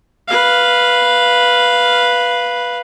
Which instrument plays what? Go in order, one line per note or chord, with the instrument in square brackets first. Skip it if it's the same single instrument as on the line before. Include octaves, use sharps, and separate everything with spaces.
[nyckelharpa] B4 F5